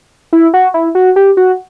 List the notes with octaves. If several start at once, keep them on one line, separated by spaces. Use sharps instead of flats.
E4
F#4
E4
F#4
G4
F#4